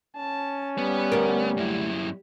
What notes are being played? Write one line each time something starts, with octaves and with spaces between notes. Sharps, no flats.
C#4 A5
G3 B3
D2 A#4
F#2 E4